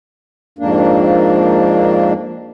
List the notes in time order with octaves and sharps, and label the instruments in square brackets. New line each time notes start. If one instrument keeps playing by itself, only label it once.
[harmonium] F2 G#2 A#3 D4